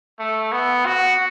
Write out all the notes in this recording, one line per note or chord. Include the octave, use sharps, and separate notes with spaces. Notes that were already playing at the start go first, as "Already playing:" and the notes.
A3
B3
F#4